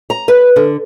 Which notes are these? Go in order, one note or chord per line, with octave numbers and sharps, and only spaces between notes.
A#5
B4
D3